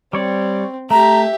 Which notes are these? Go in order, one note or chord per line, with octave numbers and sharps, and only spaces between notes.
G3 C4 C#5 D5
A3 G4 E5 A#5